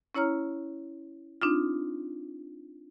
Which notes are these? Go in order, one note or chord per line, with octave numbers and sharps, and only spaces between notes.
C#4 E4 C#5 A#5 F6
C4 D4 D#4 F4